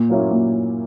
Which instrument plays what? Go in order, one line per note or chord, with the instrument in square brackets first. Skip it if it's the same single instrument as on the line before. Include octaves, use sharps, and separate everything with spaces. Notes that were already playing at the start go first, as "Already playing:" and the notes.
Already playing: [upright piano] A#2
F#3 A#3 C#4 E4
A#2